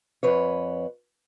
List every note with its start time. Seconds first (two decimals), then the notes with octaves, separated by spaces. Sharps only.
0.23 F2 B4 C#5